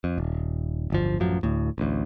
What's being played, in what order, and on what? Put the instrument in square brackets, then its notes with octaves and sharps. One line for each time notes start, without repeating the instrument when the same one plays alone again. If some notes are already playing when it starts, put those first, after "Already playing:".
[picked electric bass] F2
D#1
D1 G1 F3
A1 F#2 F3 F#3
D2 A2
A1 D2